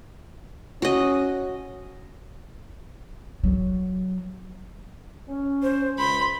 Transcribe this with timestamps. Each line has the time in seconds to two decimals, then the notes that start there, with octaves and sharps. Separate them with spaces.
0.82 C#4 F#4 D#5
3.44 F#3
5.29 C#4
5.63 C5
5.99 C#2 B5 C6